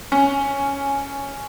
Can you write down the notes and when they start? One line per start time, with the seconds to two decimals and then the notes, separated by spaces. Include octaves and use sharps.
0.12 C#4